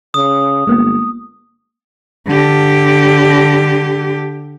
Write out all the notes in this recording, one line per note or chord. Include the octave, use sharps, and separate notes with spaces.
C#3 D#6
G1 G#3 A#3 B3
D3 G4